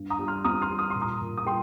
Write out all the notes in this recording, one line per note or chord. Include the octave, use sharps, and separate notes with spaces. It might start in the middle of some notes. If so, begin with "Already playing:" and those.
Already playing: G2
A#5 D#6
G3
C6 F6
C4 A#5 D#6
C6 F6
G3
D#6
A#2 C6
A#5 D#6
A#2
D#6
G3 G5 C6